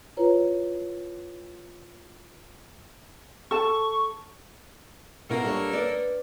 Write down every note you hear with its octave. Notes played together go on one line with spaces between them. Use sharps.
E4 F4 B4 C#5 A#5
A4 A5 C#6
B2 A#3 E4 A4 A#4 F5
G3 D4 C#5
B4 D5